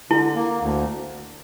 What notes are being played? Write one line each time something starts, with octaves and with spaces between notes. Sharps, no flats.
D3 E4
A#3
D2